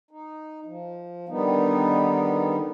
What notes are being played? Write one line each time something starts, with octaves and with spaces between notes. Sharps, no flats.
D#4
F3
D3 D#3 G3 B3 D#4